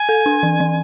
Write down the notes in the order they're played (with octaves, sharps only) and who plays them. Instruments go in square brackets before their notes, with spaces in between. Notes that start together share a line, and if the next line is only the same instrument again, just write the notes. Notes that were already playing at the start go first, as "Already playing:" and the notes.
Already playing: [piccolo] G#5
[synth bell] A4
D4
E3
E3